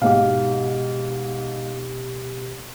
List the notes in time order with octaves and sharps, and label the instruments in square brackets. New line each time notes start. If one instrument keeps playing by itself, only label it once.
[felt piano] G#2 F5 [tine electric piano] B2 G4